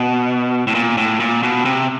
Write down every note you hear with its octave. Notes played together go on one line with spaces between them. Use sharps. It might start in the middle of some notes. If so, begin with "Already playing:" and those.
Already playing: B2
A2
A#2
A2
A#2
B2
C3